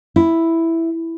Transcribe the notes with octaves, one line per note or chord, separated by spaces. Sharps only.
E4